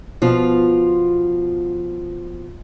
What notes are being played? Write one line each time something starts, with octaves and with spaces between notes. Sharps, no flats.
B2 F3 F4